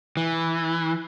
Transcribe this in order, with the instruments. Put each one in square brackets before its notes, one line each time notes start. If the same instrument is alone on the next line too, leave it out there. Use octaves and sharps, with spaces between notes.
[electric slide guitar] E3